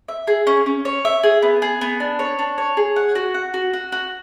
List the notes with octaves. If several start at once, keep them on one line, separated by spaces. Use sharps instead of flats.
E5
G#4
C#4
C#4
C#5
E5
G#4
B3
G#4
B3
D4
C#5
D4
C#5
G#4
F#5
F#4
F#5
F#4
F#4
F#4